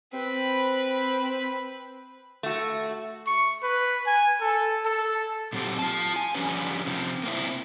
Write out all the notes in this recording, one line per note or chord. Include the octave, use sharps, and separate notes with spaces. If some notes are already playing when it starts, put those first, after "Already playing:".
C4 B4 B5
A3 F#4
C#6
B4
G#5
A4
A4
A#2 F#3 C4 G4
F4 A5
G#5
D3 F3 G3 C#4 B4
C3 F3
A#3 C4 E4